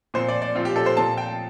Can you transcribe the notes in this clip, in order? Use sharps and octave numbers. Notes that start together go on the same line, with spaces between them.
A#2 F3 C4 C5
D5
D5
A#2 F3 C4 F4
G4
A4
C5
A#2 F3 C4 A5
G5